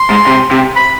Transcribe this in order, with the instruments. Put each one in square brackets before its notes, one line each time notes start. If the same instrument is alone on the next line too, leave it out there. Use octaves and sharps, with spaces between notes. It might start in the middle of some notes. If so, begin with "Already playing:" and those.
Already playing: [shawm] C6
[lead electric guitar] G#2
C3
C3
[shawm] B5